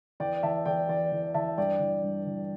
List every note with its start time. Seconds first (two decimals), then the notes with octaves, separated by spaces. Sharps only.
0.20 E2 D5 G5
0.43 E3 E5 A5
0.65 E2 D5 G5
0.89 E3 D5
1.12 E2
1.34 E3 E5 A5
1.57 G2 D5 G5
1.80 E3
2.03 G2
2.26 E3